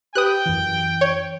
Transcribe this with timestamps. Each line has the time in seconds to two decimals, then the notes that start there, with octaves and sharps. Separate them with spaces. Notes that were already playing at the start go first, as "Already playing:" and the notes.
0.15 G4 B4 G5 D#6 F#6
0.46 F#2 E3
1.01 C#5